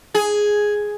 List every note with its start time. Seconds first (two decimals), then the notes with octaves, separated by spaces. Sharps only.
0.14 G#4